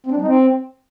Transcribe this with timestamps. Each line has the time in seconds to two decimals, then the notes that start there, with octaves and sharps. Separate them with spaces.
0.06 C4
0.11 D4
0.17 G3
0.22 D#4
0.27 C4